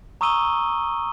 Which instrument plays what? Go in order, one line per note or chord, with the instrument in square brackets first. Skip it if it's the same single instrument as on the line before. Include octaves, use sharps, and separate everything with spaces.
[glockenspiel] A#5 C#6 D#6 E6 D#7 G7